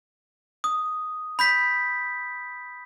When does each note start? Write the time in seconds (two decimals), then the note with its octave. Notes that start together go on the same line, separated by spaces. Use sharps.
0.64 D#6
1.39 B5 G6 B6